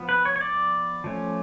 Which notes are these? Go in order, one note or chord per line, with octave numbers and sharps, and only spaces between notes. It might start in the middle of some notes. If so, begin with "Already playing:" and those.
Already playing: F3 B3
B4
C#5
C#5
D5
F3 A3 C#4